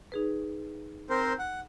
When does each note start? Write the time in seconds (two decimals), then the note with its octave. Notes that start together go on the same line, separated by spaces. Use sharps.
0.12 D#4 G#4 B4
1.10 C4 A#4 C5
1.39 F#5